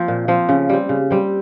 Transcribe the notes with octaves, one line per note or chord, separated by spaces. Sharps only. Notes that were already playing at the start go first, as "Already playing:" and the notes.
Already playing: F3 A#3 C4
A#2
F3 C4
C#3
G3 C4
C#3
G3 C4